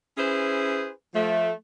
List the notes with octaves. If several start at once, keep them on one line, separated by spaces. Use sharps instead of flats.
C#4 E4 G#4 B4 C5
F3 A3